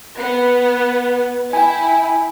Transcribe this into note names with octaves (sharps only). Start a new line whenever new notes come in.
B3
E4 G5 G#5